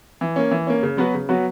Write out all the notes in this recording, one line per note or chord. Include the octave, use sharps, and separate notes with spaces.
E3
A#3 C#4
E3
A#3 C#4
C#3
F#3 B3 F#4 B4
C#3
F#3 B3 F#4 B4